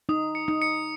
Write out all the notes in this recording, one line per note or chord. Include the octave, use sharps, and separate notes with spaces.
D#4 D#6
C#7
D#4
C#7